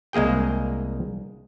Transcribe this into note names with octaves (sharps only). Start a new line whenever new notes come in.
C2 G#3 A#3 G#4 G5